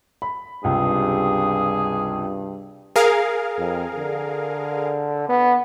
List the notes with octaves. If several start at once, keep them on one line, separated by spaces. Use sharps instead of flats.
B5
C#2 G2 C3 G#4
G#4 A#4 F5
F2
D3
B3